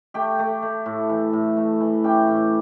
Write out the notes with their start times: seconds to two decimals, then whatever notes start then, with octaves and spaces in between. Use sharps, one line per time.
0.14 A3 G4 G5
0.39 A3
0.62 A3
0.86 A2
1.09 E3
1.33 A2
1.57 A3
1.81 E3
2.04 C#4 G4 G5
2.28 A2